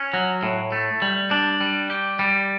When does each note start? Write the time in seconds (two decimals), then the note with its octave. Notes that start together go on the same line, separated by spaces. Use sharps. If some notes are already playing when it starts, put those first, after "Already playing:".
Already playing: C#4
0.14 F#3
0.43 A2
0.72 A3
1.02 G3
1.31 D4
1.60 G3
1.90 G4
2.19 G3